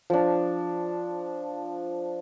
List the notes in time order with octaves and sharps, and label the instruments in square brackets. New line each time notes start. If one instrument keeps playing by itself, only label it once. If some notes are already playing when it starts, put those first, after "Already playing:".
[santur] F3 D4